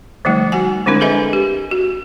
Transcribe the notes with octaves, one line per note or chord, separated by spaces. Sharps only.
D3 F3 G3 A3 D#4
F#4 F#5 G#5
D3 G#3 C4 D4 E4 A#4
G#4 A4 B4 D#5 E5 G#5
G4
F#4